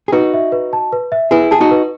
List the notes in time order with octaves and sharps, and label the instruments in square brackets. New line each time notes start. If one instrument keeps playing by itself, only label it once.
[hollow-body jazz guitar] G#4
[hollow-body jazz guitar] D#4 F#4 [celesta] B4
[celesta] E5
B4
A5
B4
E5
[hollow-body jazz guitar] E4 G#4 [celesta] B4
[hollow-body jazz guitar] G#4 [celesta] A5
[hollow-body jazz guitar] D#4 F#4
[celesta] B4